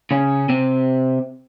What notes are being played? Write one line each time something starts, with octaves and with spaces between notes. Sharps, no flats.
C#3 C#4
C3 C4